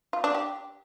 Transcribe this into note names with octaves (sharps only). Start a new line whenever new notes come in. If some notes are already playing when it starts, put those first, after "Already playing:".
F4
D4
G4